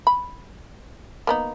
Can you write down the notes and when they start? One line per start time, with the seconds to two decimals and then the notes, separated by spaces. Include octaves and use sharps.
0.07 B5
1.27 A#3 B3 D#4